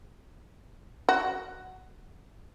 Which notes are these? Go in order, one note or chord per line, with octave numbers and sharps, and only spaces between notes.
F#4